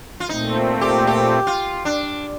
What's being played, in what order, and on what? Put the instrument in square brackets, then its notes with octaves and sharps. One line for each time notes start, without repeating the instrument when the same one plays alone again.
[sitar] F4
[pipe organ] A#2 A3 C4 [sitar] D#4
[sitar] G4
G4
F4
D4